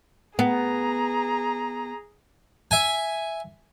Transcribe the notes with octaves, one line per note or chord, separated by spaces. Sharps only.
B3 G#4 A#5
E5 G#5